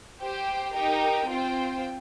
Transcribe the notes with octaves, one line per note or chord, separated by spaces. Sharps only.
G4 C5 G5
D#4 G4 A#4 G5
C4 F4 C5 G5